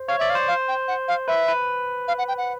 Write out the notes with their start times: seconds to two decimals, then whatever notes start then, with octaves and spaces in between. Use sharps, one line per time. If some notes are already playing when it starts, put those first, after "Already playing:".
Already playing: C5
0.08 C#5 F5
0.19 D5 E5
0.30 F5
0.35 C5
0.48 F5
0.68 G5
0.88 F#5
1.08 F5
1.28 B4 E5
1.48 B4
2.08 F5
2.18 F#5
2.28 G5
2.38 F#5